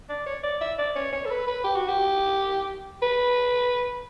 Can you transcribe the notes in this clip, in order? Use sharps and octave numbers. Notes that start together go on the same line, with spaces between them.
D5
C#5
D5
E5
D5
C#5
C#5
A4
B4
B4
G4
F#4
G4
B4